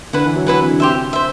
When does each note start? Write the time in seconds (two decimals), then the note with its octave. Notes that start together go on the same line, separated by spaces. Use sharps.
0.13 D3 E4 B4 F#5
0.25 E3
0.36 F#3
0.47 E3 E4 B4 F#5
0.57 C3
0.69 D3
0.80 C3 G4 C5 E5
1.13 C5 E5